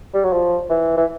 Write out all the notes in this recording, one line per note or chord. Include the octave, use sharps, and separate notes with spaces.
G3
F#3
F3
E3
E3